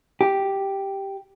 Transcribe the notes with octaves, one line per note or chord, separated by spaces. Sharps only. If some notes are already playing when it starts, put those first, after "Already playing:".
G4